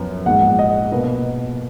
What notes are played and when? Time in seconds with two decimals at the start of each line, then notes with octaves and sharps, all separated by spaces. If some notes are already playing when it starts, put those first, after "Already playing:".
Already playing: F#2 F3 B3
0.26 A#1 G#2 F3 F#5
0.59 D#5
0.92 B2 A#3 B4